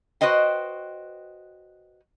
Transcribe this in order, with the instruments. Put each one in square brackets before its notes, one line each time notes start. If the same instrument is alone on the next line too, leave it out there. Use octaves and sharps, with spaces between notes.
[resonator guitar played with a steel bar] F#4 B4 C5 D#5 G5